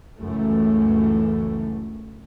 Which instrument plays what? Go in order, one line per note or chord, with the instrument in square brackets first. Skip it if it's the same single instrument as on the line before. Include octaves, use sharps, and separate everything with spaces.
[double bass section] C#2 F#2 E3 A3